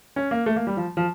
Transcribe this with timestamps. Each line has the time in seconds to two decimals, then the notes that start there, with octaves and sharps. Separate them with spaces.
0.16 C#4
0.31 A#3
0.46 A3
0.56 A#3
0.67 G3
0.77 F3
0.97 F3